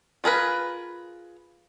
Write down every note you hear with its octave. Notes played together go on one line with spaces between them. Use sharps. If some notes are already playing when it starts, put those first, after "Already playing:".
F4 G#4 A#4 B4